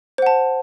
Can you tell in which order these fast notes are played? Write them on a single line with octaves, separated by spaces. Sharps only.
C5 F#5 A5